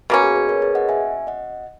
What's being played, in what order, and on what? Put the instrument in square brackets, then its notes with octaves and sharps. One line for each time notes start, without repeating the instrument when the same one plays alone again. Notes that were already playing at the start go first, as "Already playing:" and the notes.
[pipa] B2 A#3 C#4 [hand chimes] F#4
[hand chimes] G#4
G#4 B4
A#4 C#5
G#4 B4
D#5 F#5
E5 G#5
D#5 F#5